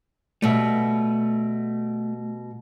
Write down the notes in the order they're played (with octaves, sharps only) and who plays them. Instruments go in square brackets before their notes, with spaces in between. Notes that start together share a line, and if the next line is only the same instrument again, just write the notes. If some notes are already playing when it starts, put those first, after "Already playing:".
[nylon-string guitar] B2 G3 [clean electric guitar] A3 E5